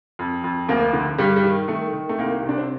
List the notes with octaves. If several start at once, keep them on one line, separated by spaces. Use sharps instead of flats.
F2
F2
D2 A#3
D3
G2 G3
G3
D#3
D#3 A3
D#3
A3
C2 A#3
C3
D4
C4